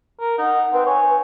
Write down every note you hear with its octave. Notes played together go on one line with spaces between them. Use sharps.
A#4
D#4 F#5
C4 B4
C#5 G#5